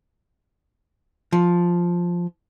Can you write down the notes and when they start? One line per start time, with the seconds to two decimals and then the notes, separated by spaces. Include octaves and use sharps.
1.33 F3